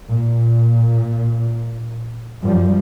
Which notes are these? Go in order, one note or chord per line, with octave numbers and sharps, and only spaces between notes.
A#2
F#2 F3 G3